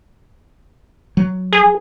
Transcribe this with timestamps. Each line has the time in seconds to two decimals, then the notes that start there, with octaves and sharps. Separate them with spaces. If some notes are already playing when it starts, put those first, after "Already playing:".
1.17 F#3
1.53 G#4